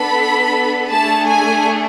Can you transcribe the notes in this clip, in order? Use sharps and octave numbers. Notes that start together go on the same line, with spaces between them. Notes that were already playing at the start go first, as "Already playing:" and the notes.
Already playing: B3 D4 A4 B5
A3 D4 G#4 A5
G#5